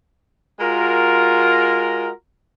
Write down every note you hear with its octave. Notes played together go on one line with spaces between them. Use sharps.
G#3 F4 F#4 A#4